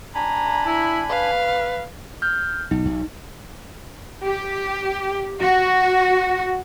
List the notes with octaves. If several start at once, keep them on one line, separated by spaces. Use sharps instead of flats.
D4 G#5 A#5 B5
E4
B4 F5
F6 G6
B1 D#4
B1
G4
F#4